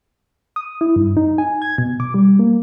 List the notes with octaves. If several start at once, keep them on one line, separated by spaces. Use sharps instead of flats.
D#6
E4
G2
D#4
G#5
G#6
B2
D6
G3
A#3